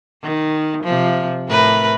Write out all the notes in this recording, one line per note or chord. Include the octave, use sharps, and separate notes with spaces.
D#3
C3 F3
A2 A#4 B4